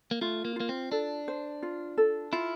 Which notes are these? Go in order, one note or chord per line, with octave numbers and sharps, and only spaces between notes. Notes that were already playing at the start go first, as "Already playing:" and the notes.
A#3
A3 F4
A#3
A#3 F4
C4
D4 A4
C5
F4
A4
E4 F4